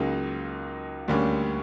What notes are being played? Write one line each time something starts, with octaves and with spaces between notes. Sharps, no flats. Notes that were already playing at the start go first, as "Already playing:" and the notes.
Already playing: C#2 C#3 F#3 A#3 D#4
D2 D3 G3 A#3 C#4